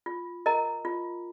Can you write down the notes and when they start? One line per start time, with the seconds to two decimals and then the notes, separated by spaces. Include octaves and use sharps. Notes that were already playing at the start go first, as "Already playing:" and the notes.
0.06 F4
0.46 A#4 D#5 A#5
0.85 F4